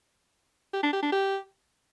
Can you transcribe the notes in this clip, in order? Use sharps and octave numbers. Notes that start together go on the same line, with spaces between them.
G4
D4
G4
D4
G4